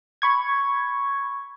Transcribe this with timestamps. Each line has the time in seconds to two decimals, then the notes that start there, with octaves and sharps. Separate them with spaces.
0.22 B5 C#6 G#6